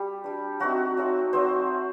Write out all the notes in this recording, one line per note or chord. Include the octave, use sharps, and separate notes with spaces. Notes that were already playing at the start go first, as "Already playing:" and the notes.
Already playing: G3 G4
G3 D4
F#3 A3 C4 D#4 F#4
F#3 A3 C4 D#4
F#3 A3 C4 D#4 C5